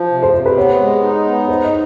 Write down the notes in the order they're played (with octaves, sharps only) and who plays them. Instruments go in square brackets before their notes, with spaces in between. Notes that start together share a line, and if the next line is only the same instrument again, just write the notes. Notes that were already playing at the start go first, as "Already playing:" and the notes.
Already playing: [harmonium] F3
C3
[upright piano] C5
[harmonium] C3 [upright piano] C5
[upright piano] B4
[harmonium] B3 [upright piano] C#5
[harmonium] G#3
D#4
B3
[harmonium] D#4 [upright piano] C5
[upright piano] D#5